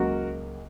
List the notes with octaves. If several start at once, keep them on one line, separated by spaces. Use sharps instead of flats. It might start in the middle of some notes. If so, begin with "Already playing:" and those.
Already playing: C#2 C#3 F#3 A#3 F#4 A#4